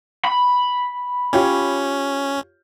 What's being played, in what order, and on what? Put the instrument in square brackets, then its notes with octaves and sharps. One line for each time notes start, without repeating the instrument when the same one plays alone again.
[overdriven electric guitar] B5
[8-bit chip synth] C#4 [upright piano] F4 G4 C#5